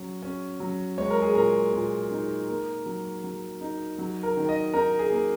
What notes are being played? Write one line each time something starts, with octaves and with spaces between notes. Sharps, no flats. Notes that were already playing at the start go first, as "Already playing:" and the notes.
Already playing: F#3 C#4 C#5
C#4
F#3
G#3 C#5
A#4
G#4
A#2 A#4
A#2
D#4
A#3
F#3
F#3
D#4
F#3
A#4
D#3
D#5
D#4 A#4
G#4
A#3